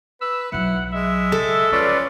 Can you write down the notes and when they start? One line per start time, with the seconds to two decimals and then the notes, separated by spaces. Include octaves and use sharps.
0.21 B4 E6
0.52 B1 F#3 E4 F#5
0.92 G#3 E5
1.32 C#3 A4
1.72 F3 C#4 F4 B4 D5